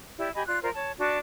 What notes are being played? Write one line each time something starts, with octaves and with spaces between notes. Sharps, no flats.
E4 G4 D5
G4 D#5 G#5 B5
F4 D5 F#6
F4 A#4 C5 D5
C#5 A5
D4 F#4 D5 A5